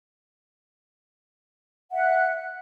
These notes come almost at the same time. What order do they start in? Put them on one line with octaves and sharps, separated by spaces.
F#5 E5 F#6